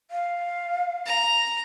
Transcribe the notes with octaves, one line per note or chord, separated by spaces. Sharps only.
F5
A#5